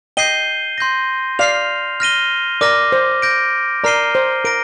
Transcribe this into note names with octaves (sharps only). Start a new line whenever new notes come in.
D#5 G5 G6 C7 D#7 G7
C6 G6 A#6
D5 F5 F6 C7 F7
F6 A#6 D#7 G7
A#4 D5 D6 F6 A#6
C5
G6 A#6 D7
A#4 D5 A#5 F6 C7 D#7 G7
C5
A#4 A#6 D7